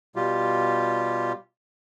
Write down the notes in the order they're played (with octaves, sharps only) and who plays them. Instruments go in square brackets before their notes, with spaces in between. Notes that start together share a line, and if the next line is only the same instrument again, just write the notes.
[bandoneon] B2 G3 F4 G4